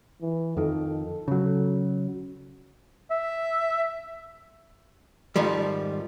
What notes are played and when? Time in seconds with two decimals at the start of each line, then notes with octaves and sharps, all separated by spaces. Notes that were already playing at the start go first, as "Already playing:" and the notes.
0.22 E3
0.57 F2 D#3 A4
1.28 C#3 F#3
3.11 E5
5.36 F2 G#2 D#3 F3 G3